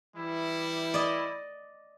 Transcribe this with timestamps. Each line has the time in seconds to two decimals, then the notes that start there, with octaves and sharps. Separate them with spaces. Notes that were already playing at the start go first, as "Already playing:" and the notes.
0.16 E3 G3 E4
0.94 D5 D#5